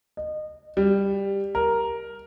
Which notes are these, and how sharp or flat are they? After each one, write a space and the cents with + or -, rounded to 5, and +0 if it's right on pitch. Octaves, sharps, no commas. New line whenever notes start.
D#5 -25
G3 +10
A#4 +5